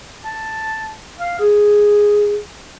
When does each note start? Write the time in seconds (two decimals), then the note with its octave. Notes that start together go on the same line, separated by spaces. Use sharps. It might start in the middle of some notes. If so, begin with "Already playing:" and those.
0.24 A5
1.19 F5
1.39 G#4